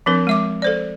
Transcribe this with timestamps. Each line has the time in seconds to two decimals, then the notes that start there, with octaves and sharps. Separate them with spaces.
0.06 F3 C4 D4 A#4 B4
0.27 G#3 E5 D6
0.62 A4 C5 D5